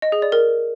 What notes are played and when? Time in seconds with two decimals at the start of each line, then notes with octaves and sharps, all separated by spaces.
0.02 D#5
0.12 G#4
0.22 D5
0.32 A#4